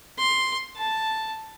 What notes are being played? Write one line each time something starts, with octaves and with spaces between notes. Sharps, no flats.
C6
A5